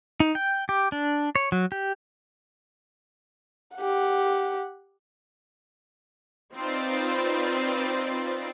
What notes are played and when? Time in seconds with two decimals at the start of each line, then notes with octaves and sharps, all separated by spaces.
0.20 D#4
0.35 G5
0.69 G4
0.92 D4
1.35 C#5
1.52 F#3
1.72 G4
3.76 G4 F#5
6.55 C4 D#4 F4 B4 C5 D5